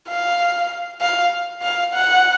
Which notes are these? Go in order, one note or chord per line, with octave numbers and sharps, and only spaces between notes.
F5
F5
F5
F#5